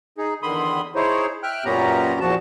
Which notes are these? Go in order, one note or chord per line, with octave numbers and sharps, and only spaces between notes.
D#4 G#4
E2 D3 D#3 B5 C6 D#6
D#4 E4 G#4 C5 C#5
E5 G5 F6 F#6
F#2 A#2 B3 C#4 G4 A#5
E2 A#2 F3 F#4 A5